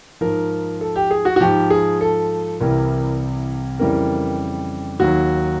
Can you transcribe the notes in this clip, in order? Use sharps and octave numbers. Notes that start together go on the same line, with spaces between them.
G#2 F3 A#4
A4
G4
G#4
F#4
F#4
G#2 F3 G4
G#4
A4
C2 C3 E3 G3 A#4
F2 C#3 E3 G3 A#4
D#2 D#3 F#3 F#4